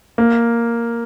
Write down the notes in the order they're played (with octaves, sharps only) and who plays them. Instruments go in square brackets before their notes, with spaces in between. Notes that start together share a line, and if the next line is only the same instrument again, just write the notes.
[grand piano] A#3